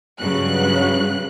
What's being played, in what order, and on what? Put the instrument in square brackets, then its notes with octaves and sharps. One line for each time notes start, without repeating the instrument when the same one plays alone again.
[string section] G2 C#3 F#3 F#6